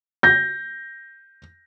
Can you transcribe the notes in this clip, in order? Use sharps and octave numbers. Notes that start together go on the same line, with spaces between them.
G6 A#6